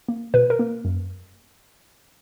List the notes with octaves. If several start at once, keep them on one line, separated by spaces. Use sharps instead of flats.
A#3
B2 B4
A#4
A#3
F#2